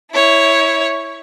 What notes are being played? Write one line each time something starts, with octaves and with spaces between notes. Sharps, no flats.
E4 C#5